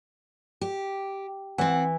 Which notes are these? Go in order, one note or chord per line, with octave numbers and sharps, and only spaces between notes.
G4
E3 C4 F#5